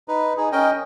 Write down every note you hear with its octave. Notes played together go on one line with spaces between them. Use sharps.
D#4 B4
D#4 G#4
C#4 A#4 D#5 G5